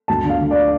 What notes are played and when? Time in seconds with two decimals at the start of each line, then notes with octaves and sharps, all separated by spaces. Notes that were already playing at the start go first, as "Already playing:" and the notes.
0.08 D2 A5
0.24 D3
0.29 F5
0.41 D3
0.51 D5